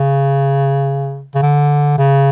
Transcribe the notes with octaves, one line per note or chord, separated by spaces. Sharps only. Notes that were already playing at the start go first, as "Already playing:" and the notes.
Already playing: C#3
C#3
D3
C#3